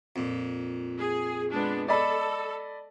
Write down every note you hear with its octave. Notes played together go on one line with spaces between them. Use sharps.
F2 A#2
G#4
G#3 B3 D4
A4 D5 D#5 B5